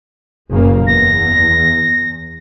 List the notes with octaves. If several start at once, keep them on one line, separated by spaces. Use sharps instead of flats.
F#1 C#3 A#3
E2 A#6